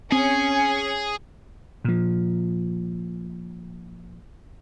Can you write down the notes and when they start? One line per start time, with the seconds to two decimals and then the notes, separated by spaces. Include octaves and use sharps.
0.12 C4 C#4 G#4 G#5
1.84 A#2 F3